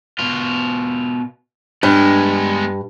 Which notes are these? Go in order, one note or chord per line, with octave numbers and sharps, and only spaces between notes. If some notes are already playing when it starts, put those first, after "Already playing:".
B2 F4
G2 G#3 B3